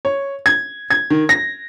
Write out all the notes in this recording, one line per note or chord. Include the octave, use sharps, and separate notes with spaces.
C#5
G#6
G#6
D#3
A#6